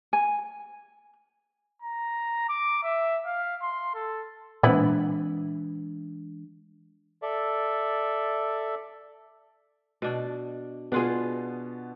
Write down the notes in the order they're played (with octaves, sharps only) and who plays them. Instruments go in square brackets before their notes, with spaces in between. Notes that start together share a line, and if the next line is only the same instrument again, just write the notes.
[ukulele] G#5
[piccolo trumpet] A#5
D6
E5
F5
C6
A4
[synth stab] A#2 C4 [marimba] E3 G#3 D4 [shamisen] B3 E4
[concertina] A4 D5 E5
[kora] B2 D4
[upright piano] B2 B3 [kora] D4 F4 G#4